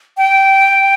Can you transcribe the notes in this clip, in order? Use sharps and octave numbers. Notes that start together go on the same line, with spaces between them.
G5